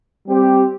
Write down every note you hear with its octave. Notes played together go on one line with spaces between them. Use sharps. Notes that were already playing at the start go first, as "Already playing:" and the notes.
G3 C4 G4